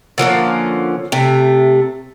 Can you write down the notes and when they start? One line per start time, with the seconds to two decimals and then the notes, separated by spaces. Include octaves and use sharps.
0.18 D3 F3 A#3 C#4
1.12 C3 A3